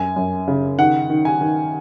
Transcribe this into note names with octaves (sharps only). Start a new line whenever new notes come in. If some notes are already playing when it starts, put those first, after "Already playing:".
Already playing: F#2 G#5
F#2
C#3
D#3 F#5
D#3
G#5
D#3